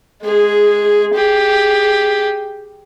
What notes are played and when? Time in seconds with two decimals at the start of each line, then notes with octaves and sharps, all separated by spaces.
0.23 G#3 G#4
1.14 G4 G#4